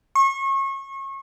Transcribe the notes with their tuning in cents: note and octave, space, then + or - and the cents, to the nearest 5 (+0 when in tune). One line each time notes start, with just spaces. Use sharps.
C#6 -35